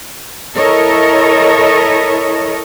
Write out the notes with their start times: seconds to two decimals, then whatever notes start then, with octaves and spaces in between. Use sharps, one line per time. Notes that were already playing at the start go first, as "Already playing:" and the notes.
0.56 E4 A4 A#4 C#5 D#5